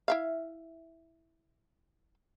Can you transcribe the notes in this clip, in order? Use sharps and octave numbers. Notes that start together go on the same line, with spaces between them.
E4 E5 F5